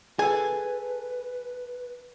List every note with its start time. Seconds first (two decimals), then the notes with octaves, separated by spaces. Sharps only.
0.19 G#4 A4 B4 G#5